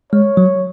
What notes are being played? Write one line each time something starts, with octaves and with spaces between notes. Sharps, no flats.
G#3 C#5
F#3